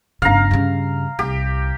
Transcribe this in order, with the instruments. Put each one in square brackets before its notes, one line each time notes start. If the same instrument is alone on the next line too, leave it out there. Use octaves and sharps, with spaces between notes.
[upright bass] G1 C#3 [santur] F5 A#5
[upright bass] G2 C#3
[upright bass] C2 [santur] G4